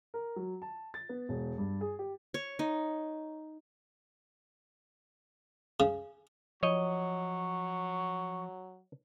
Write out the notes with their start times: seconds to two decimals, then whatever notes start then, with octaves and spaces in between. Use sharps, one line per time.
0.14 A#4
0.36 F#3
0.62 A5
0.94 A6
1.09 B3
1.29 E1
1.58 G2
1.81 G#4
1.99 G4
2.34 C#5
2.59 D#4
5.80 C#3
6.63 F3 F#3 C#5 D#5 C#6